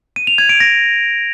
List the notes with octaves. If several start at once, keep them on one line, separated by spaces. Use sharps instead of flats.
D#7
F7
G#6
D7
A#6